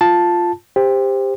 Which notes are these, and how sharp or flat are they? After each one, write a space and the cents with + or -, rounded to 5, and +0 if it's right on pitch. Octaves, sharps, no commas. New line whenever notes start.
F4 +0 A5 +0
G4 +20 C5 +0